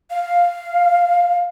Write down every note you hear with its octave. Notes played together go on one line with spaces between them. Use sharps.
F5